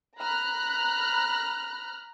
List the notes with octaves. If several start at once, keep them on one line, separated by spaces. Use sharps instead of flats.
A#5 B5 F6 F#6